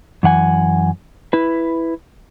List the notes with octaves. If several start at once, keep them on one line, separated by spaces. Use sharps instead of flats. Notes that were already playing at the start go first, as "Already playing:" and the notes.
F#2 E3 F#5 G#5
E4 B4